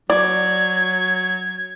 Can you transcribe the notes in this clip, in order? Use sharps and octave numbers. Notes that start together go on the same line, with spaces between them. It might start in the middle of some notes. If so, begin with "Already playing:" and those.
F#3 D5 G#6